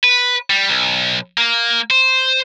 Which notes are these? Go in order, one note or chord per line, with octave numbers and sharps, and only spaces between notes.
B4
G3
B1
A#3
C5